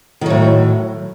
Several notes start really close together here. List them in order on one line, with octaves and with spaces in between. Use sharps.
D#3 F#3 A2